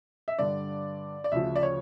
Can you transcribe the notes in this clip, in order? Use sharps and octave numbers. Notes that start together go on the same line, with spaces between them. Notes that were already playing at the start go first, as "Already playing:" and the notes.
E5
G2 D3 G3 D5
D5
D2 C#3 F3 E5
D5
C#5